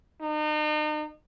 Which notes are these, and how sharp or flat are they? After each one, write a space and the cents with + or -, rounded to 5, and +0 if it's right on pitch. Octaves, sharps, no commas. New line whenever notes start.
D#4 -40